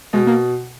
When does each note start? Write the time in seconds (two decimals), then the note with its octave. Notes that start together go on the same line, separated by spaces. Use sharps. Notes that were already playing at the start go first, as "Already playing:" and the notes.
0.13 B2 G#3
0.27 A#3